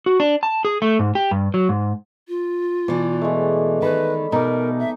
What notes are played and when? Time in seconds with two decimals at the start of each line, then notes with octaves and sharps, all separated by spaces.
0.06 F#4
0.20 D4
0.43 A5
0.65 G#4
0.82 A3
0.99 G#2
1.15 G4
1.31 G2
1.54 F#3
1.69 G#2
2.28 F4
2.88 B2 E3 D5
3.22 G#3 A3
3.82 D#3 B4 B5
4.32 B2 D#4 A#4 D6
4.79 E5